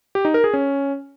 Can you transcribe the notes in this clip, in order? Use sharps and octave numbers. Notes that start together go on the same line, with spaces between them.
G4
D#4
A#4
G#4
C#4